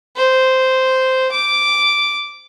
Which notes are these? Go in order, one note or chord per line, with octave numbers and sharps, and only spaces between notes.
C5
D6